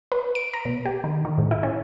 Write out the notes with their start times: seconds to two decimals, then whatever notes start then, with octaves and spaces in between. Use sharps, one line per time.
0.12 B4
0.35 D7
0.54 A#5
0.65 B2
0.86 G4
1.04 D#3
1.25 D#3
1.38 A2
1.51 E4
1.63 C#4